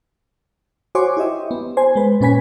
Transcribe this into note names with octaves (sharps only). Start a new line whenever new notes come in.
F#4 C5 C#5 G#5 C6 D6
E4 G4 D#5 E5
B3
C5 G#5
G#3 B4
A#2 C#4 B4 G#5 B6